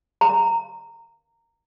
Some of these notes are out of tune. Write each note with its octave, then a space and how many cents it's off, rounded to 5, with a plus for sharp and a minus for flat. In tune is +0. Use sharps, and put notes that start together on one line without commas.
A#5 -20